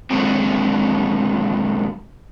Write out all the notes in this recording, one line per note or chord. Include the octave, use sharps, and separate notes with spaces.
A#2 D3 D#3 F#3 G#3 C4